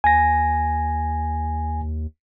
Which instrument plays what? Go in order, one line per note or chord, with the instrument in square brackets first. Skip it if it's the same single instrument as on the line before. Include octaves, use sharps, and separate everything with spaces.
[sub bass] D#2 [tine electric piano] G#5 A#6